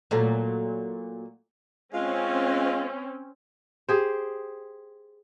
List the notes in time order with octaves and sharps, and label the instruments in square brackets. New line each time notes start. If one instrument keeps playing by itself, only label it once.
[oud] A#2 F#3 A3
[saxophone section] G#3 F4 [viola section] C4 C#4
[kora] G4 G#4 C5